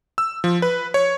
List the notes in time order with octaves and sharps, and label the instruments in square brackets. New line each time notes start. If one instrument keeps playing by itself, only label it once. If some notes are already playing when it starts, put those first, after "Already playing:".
[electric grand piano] E6
F3
B4
C#5